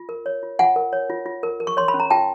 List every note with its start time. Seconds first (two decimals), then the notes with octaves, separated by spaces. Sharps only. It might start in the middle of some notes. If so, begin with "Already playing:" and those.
Already playing: F4
0.09 A#4
0.26 C#5
0.43 F4
0.59 F4 F#5 G#5
0.76 A#4
0.93 C#5
1.10 F4
1.26 F4
1.43 A#4
1.60 A#4
1.67 C#6
1.77 C#5 C6
1.88 B5
1.94 C#4
2.00 A#5
2.10 F4 G5 A5